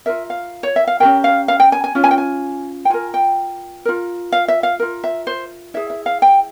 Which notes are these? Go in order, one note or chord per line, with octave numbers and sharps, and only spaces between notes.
F4 A#4 E5
F5
C#5
E5
F5
C#4 G4 A#4 G5
F5
F5
G5
G#5
G#5
C#4 F4
G#5
G5
G#5
G5
F4 A#4 G#5
G5
F4 A#4
F5
E5
F5
F4 A#4
E5
C5
E4 G#4 E5
E5
F5
G5